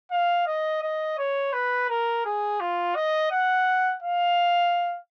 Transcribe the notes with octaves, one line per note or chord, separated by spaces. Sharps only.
F5
D#5
D#5
C#5
B4
A#4
G#4
F4
D#5
F#5
F5